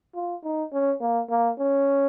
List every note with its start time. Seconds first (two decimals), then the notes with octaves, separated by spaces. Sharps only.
0.15 F4
0.44 D#4
0.72 C#4
1.01 A#3
1.30 A#3
1.59 C#4